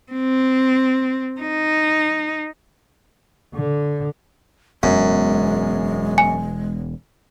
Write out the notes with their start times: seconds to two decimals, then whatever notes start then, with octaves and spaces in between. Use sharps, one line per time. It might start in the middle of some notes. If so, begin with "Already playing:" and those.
0.12 C4
1.41 D#4
3.55 D3
4.83 E1 F#2 G#3 B3
6.18 G#5